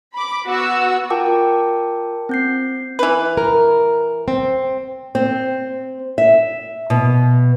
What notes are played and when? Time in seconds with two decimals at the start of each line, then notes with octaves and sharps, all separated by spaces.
0.14 B5 D6
0.46 B3 F#4 E6
1.10 F4 A#4 G5 A5 D6
2.29 C4 G6 C7
2.99 E3 B4
3.37 A#4
4.28 C4
5.15 C4
6.18 E5
6.90 B2